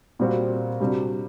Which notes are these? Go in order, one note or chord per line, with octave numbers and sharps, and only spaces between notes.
A#2 G3 C4 F#4
C3 G3 D4 F#4